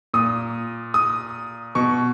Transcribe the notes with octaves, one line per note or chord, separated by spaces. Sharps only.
A#2 D#6
D#6
B2 C#6